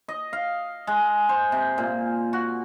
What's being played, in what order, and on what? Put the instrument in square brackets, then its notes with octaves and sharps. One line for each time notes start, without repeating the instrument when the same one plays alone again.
[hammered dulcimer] D#5
F5
G#3
C5
C3
A#2
F#4